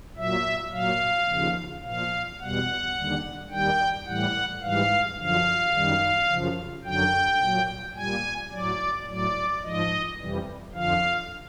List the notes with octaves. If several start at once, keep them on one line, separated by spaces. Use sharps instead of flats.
A#2 F#3 E5
A#2 F#3 F5
D#2 C#3 F3
A#2 F3 F5
E2 B2 G3 F#5
D#2 D3 G3
D#2 D#3 G3 G5
A2 E3 G3 F#5
G#2 E3 G3 F5
F#2 D3 F3 F5
F#2 D#3 G3
F#2 C#3 F3
F#2 D3 F#3 G5
A#2 F#3
A#2 G3 G#5
A2 F#3 D5
A2 F#3 D5
G#2 F3 D#5
F2 C3 E3 G3
F2 D3 F3 F5